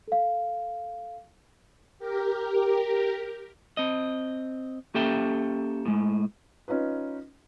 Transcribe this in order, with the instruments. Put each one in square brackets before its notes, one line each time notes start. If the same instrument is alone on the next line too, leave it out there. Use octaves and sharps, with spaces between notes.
[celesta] A4 F5
[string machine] G4 A#4
[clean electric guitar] C4 D#5
A#3 C#4 G4 A4 E5 G5
A2 G#3
[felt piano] C#4 D#4 F4 B4